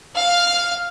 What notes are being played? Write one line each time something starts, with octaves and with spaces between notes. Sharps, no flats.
F5 F6